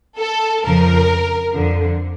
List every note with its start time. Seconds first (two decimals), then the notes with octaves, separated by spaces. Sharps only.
0.18 A4
0.63 F2 C#3 F3 A#4
1.53 F2 D3 F3